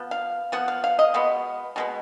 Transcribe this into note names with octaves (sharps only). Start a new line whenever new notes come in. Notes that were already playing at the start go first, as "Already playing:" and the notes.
Already playing: F3 B3
F5
F3 B3 F#5
F5
F5
D#5
B2 G#3 B3
B2 G#3 B3